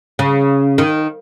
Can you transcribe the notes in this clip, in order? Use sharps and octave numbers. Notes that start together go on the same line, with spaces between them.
C#3
D#3